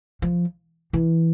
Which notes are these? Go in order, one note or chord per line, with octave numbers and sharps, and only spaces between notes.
F3
E3